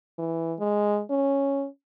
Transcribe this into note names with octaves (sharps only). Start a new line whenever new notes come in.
E3
G#3
C#4